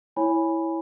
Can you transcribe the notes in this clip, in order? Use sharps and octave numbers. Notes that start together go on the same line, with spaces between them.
E4 C#5 G#5 B5